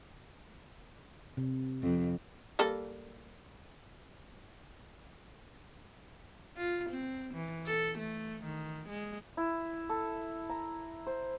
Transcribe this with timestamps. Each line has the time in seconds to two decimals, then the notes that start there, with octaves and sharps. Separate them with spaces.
1.37 C3
1.82 F2
2.59 G3 A#3 A4
6.57 F4
6.90 C4
7.34 E3
7.67 A4
7.99 A3
8.44 D#3
8.89 G#3
9.37 E4
9.90 A4
10.50 A#5
11.07 C5